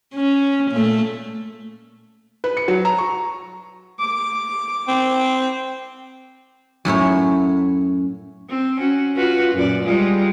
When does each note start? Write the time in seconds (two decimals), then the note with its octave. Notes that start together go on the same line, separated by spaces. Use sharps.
0.15 C#4
0.71 A#2 A3
2.44 B4
2.57 C#7
2.68 F#3
2.85 A#5
2.98 C#6
3.99 D6
4.88 C4
6.85 F#2 A2 E4 C#5
8.49 C4
8.80 C#4 F#4
9.15 F4 F#4 B4
9.54 F#2 A#2 D5
9.83 G3 G#3 F4